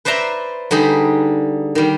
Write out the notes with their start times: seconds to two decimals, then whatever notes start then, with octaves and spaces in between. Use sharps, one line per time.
0.05 B4 C5 D5 E5 A#5 C6
0.71 D3 G3 D#4 G#4 B5
1.75 D#3 G3